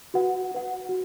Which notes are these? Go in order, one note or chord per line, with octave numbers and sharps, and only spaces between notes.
F#4 B4 F#5
F#4 B4 F#5
F#4